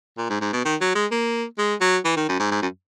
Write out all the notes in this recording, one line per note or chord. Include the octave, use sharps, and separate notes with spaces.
A#2
G#2
G#2
B2
D#3
F#3
G#3
A#3
G#3
F#3
E3
D#3
F#2
G#2
G#2
F#2